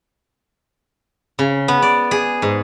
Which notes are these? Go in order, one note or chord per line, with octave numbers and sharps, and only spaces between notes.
C#3
B3
D5
G#4
G#2